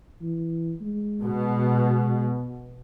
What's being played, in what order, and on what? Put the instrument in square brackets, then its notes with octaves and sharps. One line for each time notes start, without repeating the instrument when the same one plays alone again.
[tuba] E3
G#3
[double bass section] B2